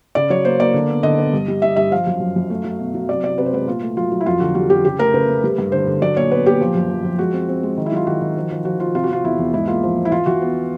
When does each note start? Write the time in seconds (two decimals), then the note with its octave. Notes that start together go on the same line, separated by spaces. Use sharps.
0.15 C#3 D5
0.30 F#3 C#5
0.45 A#3 C5
0.60 A#3 D5
0.74 D3
0.89 B3
1.03 D3 D#5
1.18 B3
1.33 G2
1.48 G3
1.62 G3 E5
1.76 G2 E5
1.91 F3 F5
2.07 F#2
2.20 F#2
2.36 F#2
2.50 A3
2.64 F#3
2.79 B2
2.94 F#3
3.09 C3 D5
3.23 C3 D5
3.38 C3 B4
3.46 C5
3.53 G#3 B4
3.67 A#2 F4
3.82 A3
3.97 F#3 F4
4.12 F#3
4.21 E4
4.26 F2 F4
4.40 D3 F#4
4.55 G3 F#4
4.70 F2 G4
4.85 C#3 G4
4.99 A3 A#4
5.14 C#3 B4
5.28 A3
5.44 G3
5.58 G2
5.72 D3 C5
5.87 D3
6.02 F#3 D5
6.17 A#2 C#5
6.31 B3 B4
6.46 A#2 G4
6.61 F3
6.75 F#2
6.90 F3
7.04 F3
7.19 G#3 F#4
7.33 C4
7.49 C4
7.63 G#3
7.77 D#3
7.86 E4
7.92 F#3 F4
8.07 D#3 F#4
8.21 D#3
8.37 F3
8.51 F3
8.65 F3 F#4
8.79 F3 F4
8.94 C3 F4
9.04 F#4
9.09 C3 F4
9.24 E2 E4
9.39 E2
9.54 G#2 E4
9.67 A#3 F4
9.83 F3
9.98 G#2
10.05 E4
10.12 E3 F4
10.26 E3 F#4
10.42 B3